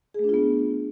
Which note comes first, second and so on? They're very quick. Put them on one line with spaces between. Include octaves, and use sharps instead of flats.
G#4 A3 D4 F4 B3